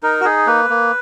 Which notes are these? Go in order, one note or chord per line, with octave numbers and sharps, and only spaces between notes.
D#4 A#4
F#4
D#4 G#4
A#3 B4
A#3